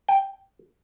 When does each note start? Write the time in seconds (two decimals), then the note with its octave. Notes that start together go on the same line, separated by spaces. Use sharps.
0.08 G5